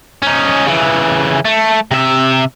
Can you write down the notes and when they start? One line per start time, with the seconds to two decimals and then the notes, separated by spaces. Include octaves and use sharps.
0.22 C#4 D#4
0.67 C#3 E3
1.45 A3
1.91 C3 E5